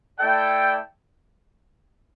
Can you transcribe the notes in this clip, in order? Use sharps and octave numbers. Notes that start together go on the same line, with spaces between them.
A3 E4 A4 D5 G5